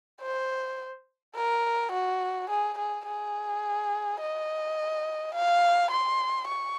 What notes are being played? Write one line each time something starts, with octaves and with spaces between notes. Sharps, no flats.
C5
A#4
F#4
G#4
G#4
G#4
D#5
F5
C6
C#6